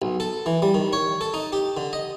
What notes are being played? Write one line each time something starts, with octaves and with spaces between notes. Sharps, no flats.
B1
A4
E3
G3
D#3
C#5
A4
D#4
G4
D3
D#5